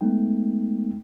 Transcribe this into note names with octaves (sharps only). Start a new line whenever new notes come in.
G#3 A3 B3 D#4 G5